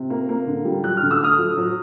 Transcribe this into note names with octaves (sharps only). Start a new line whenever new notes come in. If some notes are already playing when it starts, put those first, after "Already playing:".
Already playing: C3
A#3
A#3
D3
G3
F#3 F#6
F6
D3
E6
A3 D#6 F6
F#3
F#3